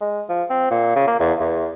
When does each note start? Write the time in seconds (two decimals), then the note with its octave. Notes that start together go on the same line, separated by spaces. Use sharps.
0.01 G#3
0.29 F3
0.50 C4
0.71 A#2
0.95 C#3
1.07 A#3
1.19 E2
1.40 E2